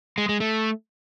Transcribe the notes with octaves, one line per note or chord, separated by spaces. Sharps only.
G#3
G#3
A3